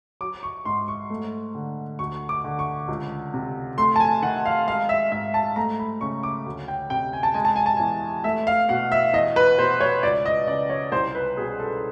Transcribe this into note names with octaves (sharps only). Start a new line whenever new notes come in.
F#3 D6
C#6
G#2 C6
C#6
A3
D3
D2 C#6
D6
D3
C#6
C#2
C3
A3 C6
A5
G#5
D#3 F#5
F5
G#3 F5
E5
G#2 E5
A5
A3 A#5
B5
C#3 C#6
D6
D2
G5
C3 G5
G#5
A5
G#3 G#5
A5
G#5
A5
E2 G#5
A3 E5
F5
B2 F#5
E5
E2 D#5
B4
B2 C5
C#5
C#2 D5
D#5
C#3 D5
C#5
C2 C5
B4
B2 G#4
A4